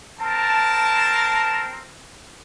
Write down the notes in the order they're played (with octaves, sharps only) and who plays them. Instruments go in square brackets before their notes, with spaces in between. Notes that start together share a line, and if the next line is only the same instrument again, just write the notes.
[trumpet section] C4 A#4 [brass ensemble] A5